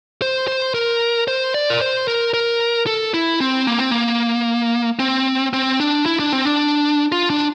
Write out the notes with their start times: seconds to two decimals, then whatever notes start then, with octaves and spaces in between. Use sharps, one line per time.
0.22 C5
0.48 C5
0.74 A#4
1.28 C5
1.54 D5
1.70 A#4
1.81 C5
2.08 A#4
2.34 A#4
2.87 A4
3.14 E4
3.40 C4
3.67 A#3
3.78 C4
3.91 A#3
4.99 C4
5.53 C4
5.80 D4
6.06 E4
6.19 D4
6.33 C4
6.45 D4
7.12 F4
7.30 D4